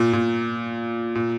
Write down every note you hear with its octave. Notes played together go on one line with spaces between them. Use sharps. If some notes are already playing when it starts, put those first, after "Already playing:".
Already playing: A#2
A#2
A#2